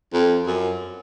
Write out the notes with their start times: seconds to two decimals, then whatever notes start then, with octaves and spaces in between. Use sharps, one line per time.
0.13 F2
0.47 F#2